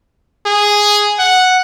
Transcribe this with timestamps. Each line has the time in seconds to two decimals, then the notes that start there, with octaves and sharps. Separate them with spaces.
0.46 G#4
1.19 F#5